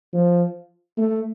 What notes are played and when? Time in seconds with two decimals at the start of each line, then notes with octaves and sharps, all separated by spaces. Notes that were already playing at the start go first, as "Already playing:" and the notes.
0.13 F3
0.97 A3